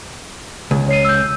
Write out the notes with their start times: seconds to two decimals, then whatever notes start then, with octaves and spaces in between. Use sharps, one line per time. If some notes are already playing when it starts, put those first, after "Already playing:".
0.71 C#2
0.88 C#5 C7 D#7
1.05 E6 G6